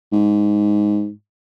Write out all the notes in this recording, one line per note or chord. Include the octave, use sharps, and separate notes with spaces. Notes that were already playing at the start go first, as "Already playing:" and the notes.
G#2